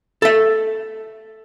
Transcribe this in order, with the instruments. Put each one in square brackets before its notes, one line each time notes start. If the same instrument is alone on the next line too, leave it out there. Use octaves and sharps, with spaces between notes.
[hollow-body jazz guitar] A4 E5